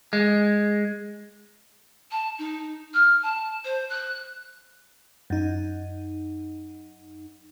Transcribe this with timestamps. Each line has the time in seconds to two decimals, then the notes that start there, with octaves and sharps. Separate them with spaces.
0.13 G#3
2.11 A5
2.38 D#4
2.93 F6
3.22 A5
3.64 C5
3.89 F#6
5.30 F#2 D#4